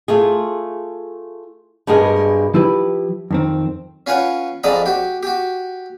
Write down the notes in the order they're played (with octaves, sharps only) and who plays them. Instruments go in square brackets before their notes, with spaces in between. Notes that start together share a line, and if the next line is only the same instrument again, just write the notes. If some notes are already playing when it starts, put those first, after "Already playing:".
[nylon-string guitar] A3 F4 G#4
G2 B2 G#3 G#4 A#4
[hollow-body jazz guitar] F3 E4 G4 B4
F2 D#3 C4
[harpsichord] C#4 F4 B4 C#5 F#5
F2 G#2 D5 D#5 A#5 B5
F#4 G4
F#4 G4